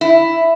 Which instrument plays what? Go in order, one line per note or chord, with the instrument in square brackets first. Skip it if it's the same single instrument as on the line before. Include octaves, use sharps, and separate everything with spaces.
[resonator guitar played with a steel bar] E4